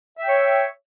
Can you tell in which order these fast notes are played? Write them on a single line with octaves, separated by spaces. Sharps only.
E5 G5 C#5